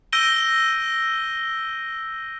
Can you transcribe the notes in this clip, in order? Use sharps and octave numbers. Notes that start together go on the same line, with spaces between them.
E6 G6 A#6 D7 D#7 G7